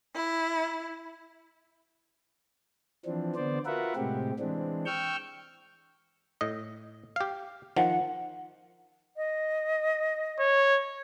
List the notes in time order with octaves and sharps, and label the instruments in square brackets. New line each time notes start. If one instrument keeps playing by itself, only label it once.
[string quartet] E4
[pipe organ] E3 F3 C4 D4
D3 B3 C5 D5
F4 F#4 A#4 B4 E5 F#5
A2 C3 G#3 C4 G4
E3 G#3 C4 D4
G5 C#6 E6 F6 G6
[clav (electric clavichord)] A2 D#5
G4 F5
[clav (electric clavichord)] D#3 F3 [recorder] F#5
[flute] D#5
[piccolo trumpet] C#5